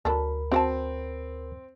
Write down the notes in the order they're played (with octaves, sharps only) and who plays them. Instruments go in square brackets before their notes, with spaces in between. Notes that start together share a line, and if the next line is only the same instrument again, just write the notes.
[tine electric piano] D2 A#4 B5 [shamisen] F#3 D4 A4
[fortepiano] C4 [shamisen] F#4 F#5 A5